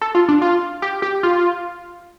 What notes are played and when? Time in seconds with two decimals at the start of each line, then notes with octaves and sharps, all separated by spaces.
0.02 A4
0.15 F4
0.28 D4
0.42 F4
0.82 G4
1.02 G4
1.23 F4